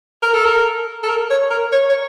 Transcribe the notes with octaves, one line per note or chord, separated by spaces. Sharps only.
A#4
A4
A#4
A4
A#4
C#5
A#4
C#5
C#5